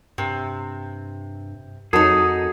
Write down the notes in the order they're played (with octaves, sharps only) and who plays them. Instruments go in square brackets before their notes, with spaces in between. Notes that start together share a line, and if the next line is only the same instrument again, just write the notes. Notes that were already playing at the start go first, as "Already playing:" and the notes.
[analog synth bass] G2 [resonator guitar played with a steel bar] C3
[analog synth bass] F2 [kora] F#3 [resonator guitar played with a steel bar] D#4 A4 [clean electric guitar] G#4